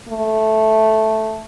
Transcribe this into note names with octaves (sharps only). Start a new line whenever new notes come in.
A3